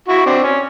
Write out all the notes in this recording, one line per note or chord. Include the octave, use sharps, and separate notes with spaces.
E4 F#4
C4 D4
C#4